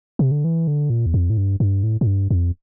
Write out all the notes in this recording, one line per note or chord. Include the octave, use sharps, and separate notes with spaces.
C3
D3
E3
D3
A#2
E2
F2
A2
G2
G2
A2
A2
G2
F2